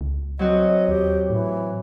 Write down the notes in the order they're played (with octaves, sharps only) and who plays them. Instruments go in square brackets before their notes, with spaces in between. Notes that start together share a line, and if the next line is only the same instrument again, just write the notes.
[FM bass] C#2
[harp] F#3 C4 F#4 [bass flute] D#5
[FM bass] D#2 [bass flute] G4
[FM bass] A2 [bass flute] E3